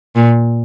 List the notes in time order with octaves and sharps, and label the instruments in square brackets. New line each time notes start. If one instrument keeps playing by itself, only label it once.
[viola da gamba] A#2